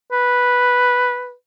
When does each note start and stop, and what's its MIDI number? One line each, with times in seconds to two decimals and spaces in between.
0.12 1.33 71